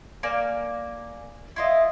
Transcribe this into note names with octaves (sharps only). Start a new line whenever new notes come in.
A#3 D5 G#5 F6
E4 F4 D#5